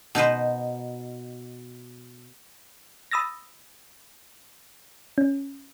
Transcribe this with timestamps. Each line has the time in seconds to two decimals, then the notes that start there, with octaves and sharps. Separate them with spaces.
0.15 B2 D#4 B4 C5
3.11 B5 D#6 E6 A6 A#6
5.18 C#4